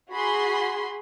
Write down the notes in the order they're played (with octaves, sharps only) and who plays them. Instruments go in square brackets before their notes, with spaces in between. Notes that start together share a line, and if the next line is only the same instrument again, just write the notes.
[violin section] F#4 G#4 B5 C6